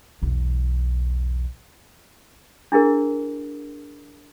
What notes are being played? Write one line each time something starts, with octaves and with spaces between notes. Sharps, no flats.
B1 E2
D4 E4 G#4 A#4